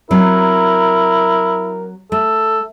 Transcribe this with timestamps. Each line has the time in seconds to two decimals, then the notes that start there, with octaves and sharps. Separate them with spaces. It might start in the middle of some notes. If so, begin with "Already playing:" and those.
0.11 F#3 C4 E4 A#4
2.12 A3 A4